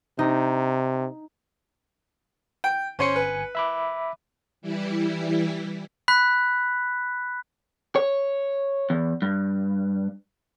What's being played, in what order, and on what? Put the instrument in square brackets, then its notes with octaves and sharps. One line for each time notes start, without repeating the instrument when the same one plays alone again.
[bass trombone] C3 [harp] D#4
[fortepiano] G5
[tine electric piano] G1 G#5 C#7 [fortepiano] C#4 C5 C#5
[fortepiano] B4
[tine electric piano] E5 B5 D6
[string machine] E3 G3 E4
[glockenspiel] B5 F#6 B6
[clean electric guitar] C#5
E2
G2